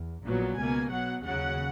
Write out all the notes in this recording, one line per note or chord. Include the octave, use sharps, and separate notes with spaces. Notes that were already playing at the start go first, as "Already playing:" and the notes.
Already playing: E2
A#1 A#2 F#3 B3
C#2 B2 A#3 G#5
B1 B2 F#3 F#5
D#2 C#3 F#3 F#5